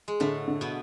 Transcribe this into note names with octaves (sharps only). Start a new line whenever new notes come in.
G#3
A2 D3 A3
D3
B2 B3